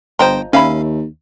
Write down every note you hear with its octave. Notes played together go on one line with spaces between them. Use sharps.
G1 F3 C5 D#5 G5 A#5 C6
D#2 C#4 C#5 E5 F5 B5